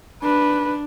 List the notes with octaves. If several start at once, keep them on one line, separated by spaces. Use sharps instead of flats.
D4 B4